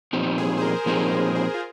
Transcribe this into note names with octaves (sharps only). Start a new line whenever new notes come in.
A#2 F3 C4 D#4 G4
G#4
C5
A#4
A#2 F3 C4 D#4 G4 A#4
C5
G#4
F4